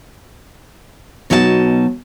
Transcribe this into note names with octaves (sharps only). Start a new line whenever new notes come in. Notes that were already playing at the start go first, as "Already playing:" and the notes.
B2 F#3 D#4 E5 A5